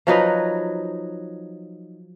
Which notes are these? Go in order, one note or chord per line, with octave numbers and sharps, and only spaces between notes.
F3 F#3 D#4 B4